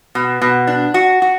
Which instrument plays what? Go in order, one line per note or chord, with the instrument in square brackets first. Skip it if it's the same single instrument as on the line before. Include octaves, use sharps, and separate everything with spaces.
[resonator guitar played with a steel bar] B2
B2
D4
F#4
F#4